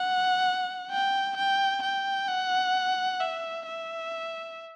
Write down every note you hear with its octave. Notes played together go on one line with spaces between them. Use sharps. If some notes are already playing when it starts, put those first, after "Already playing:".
Already playing: F#5
G5
G5
G5
F#5
E5
E5